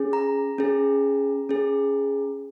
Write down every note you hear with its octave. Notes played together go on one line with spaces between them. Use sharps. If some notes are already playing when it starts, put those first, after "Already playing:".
Already playing: C#4 G#4
A#5
C#4 G#4
C#4 G#4